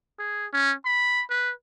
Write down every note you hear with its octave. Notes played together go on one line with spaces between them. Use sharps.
G#4
C#4
B5
B4